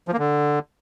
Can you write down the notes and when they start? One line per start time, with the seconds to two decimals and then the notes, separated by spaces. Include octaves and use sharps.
0.08 F3
0.13 A#3
0.19 D3